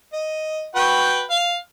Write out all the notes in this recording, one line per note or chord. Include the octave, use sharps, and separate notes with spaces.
D#5
F#4 B4 G5
F5